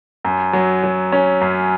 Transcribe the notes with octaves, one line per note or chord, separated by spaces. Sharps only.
F#2
F#3
F#3
C#4
F#2